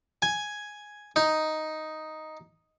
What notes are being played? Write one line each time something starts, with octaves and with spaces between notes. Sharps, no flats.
G#5
D#4